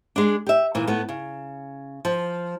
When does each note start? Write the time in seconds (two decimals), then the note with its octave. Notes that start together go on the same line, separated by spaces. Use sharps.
0.16 G#3 D4
0.46 G4 E5
0.75 A#2 E3
0.87 A2 B3
1.09 C#3
2.05 F3